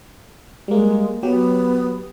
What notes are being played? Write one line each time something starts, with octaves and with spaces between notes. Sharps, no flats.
G3 G#3 A#3
F#3 B3 G4